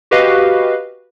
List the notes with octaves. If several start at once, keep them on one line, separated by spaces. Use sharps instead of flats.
F#4 G4 B4 D#5 F5